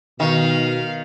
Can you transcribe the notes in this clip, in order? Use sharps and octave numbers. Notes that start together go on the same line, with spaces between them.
B2 D#3 F5